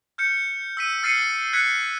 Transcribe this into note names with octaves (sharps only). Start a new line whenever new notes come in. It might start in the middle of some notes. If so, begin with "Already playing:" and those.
F6 G6 C#7
E6 B6 D#7
E6 F6 A6 C7 C#7 D#7
F#6 G#6 B6 C#7